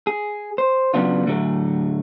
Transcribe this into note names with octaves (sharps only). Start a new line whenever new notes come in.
G#4
C5
C#3 F#3 B3 D4 F4
A2 D3 F#3 A3